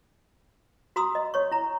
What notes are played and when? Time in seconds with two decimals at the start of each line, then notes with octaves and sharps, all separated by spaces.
0.96 F#4 A#5 C6 D#6 E6
1.15 D#5
1.34 C#5 C#6
1.51 E4 A#5